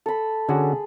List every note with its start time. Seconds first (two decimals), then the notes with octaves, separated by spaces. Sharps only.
0.06 A4 B5
0.49 D3 C#4 F#4 G#4